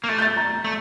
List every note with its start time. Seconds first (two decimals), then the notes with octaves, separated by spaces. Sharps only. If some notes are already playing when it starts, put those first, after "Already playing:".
0.04 A#3
0.08 A3 A6
0.18 G6
0.22 A6
0.37 A#5
0.64 A3